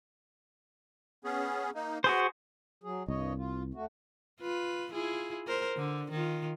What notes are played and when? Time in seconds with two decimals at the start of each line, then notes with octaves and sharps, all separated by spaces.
1.24 B3 C#4 G#4
1.75 A#3 D#4
2.04 F#4 G#4 B4 C5 F#5
2.84 F#3 G#4
3.08 C2 G2 C#5 D#5
3.37 F4
3.74 D2 A3 F#4
4.41 F4 B4
4.91 E4 F4 G#4
5.47 A#4 C5
5.76 D3
6.11 D#3 F4